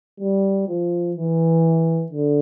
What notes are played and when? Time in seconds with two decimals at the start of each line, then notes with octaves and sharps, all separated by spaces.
0.20 G3
0.68 F3
1.16 E3
2.12 D3